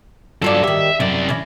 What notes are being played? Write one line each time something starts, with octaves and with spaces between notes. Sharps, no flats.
G2 F#3 F4 A4 D5
D#3 G4 E5
F#2 C3 D5
C#4 E4